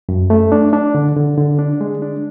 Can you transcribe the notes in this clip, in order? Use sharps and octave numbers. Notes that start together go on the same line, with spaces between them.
F#2
A3
D4
D4
D3
D3
D3
D4
G#3
D4